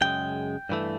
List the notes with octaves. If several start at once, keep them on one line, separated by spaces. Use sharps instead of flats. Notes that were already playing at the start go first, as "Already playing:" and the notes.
F#2 C#3 G#3 G5
G2 E3 A3